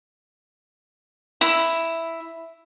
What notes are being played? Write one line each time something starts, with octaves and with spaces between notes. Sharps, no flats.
E4